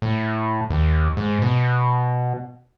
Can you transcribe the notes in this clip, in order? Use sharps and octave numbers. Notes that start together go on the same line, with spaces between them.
A2
D#2
G#2
B2